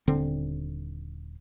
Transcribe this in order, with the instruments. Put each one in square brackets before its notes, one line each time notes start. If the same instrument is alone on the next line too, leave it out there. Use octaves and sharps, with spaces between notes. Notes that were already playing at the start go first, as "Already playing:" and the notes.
[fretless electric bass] D#1 D3 C4